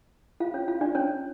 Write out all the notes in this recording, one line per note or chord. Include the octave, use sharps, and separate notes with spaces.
F4 F5
C#4 C#5
F4 F5
D4 D5
C#4 C#5